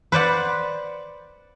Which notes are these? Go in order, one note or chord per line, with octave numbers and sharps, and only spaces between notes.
B4 C5 D5 F#5